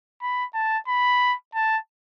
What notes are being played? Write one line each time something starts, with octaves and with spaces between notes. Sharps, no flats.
B5
A5
B5
A5